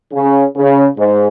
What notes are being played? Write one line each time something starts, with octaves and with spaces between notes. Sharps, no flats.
C#3
C#3
G#2